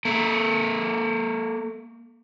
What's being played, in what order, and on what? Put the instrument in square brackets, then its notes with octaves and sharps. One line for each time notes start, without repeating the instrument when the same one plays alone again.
[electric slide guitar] A#3 A4